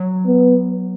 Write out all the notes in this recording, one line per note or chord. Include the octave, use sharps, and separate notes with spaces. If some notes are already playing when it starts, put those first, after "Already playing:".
Already playing: F#3
B3